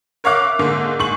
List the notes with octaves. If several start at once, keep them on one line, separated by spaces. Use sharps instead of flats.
A#4 C#5 E5 F5 D6 F#6
G#2 D3 A#3
G#2 C#6 F#7